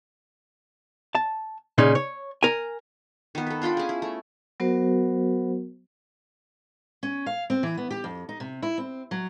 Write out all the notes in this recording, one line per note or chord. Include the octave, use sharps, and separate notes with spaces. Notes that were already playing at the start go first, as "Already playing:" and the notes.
A5
A#2 C#3 D#4
C#5
A#4 G#5
D#3 B3
A4 B4
D4 F4 G5 B5
C#4 G#4
E4
A3
F#3 B3 F#4 A#4 C5
C#4
F5
C4
E3
B3
G4
F2
D#4
C3
E4
C4
F#3